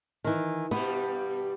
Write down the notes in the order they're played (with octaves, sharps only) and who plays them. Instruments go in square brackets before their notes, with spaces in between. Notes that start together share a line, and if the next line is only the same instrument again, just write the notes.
[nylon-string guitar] D#3 E3
[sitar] G2 B2 G3 [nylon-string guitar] B3